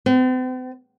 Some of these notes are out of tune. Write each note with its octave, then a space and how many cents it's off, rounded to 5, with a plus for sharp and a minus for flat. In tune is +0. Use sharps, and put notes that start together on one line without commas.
C4 -45